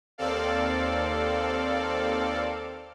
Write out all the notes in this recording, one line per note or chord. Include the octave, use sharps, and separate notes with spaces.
D#2 C4 A4 D5 F5